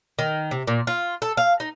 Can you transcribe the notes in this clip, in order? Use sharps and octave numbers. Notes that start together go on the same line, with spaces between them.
D#3
C3
A#2
F4
A4
F5
D#4